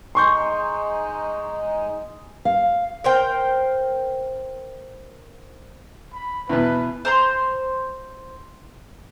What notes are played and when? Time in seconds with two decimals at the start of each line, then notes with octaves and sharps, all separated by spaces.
0.15 G#3 D#4 C6 C#6 G6
2.45 F5
3.04 A#4 C5 G5
6.14 B5
6.49 E2 B2 B4
7.05 C5 A#5 C6